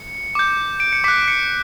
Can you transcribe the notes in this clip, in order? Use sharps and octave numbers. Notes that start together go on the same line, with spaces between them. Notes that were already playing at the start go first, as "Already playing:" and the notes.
Already playing: C#7
D6 G6
D7
C#7
D6 F#6 B6
C#7